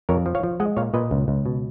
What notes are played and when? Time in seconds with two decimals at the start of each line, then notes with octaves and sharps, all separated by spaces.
0.09 F2 A#4 C#5
0.26 F3
0.35 C#5 F5
0.43 F3
0.60 G#3 D#5 F#5
0.77 A#2 C#5 F5
0.94 A#2 B4 D#5
1.11 C#2
1.28 C#2
1.46 B2